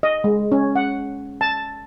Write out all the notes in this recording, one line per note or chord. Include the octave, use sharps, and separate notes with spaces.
D#5
G#3
C#4
F#5
A5